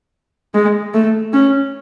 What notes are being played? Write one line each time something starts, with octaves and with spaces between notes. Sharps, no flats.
G#3
A3
C#4